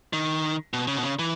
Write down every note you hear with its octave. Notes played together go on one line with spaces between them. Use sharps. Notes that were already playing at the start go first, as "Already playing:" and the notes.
D#3
B2
C#3
B2
C#3
E3